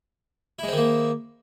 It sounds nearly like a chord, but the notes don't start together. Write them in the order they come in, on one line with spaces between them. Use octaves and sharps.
E4 G#3 C4 D#3 A#3